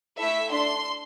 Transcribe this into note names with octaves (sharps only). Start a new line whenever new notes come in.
A3 E4 A4 E5
D4 A4 C6